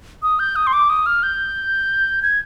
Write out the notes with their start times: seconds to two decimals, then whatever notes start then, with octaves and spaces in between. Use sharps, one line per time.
0.23 D#6
0.39 G6
0.56 D#6
0.67 C6
0.73 D6
0.90 D#6
1.06 F6
1.23 G6
2.22 G#6